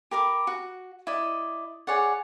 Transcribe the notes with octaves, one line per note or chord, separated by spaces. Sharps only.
G4 A#4 B5 D6
F#4
E4 D5 D#5
G#4 C#5 D5 F#5